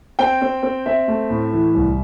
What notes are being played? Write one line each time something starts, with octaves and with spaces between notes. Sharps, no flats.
C4 G5
C4
C4
C4 E5
A3
A2
E3
C2